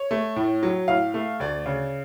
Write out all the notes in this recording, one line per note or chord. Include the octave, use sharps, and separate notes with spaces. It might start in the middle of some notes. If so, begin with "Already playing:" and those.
Already playing: C#5
A3
A2
F#3
A2 F5
A3
D2 D5
C#3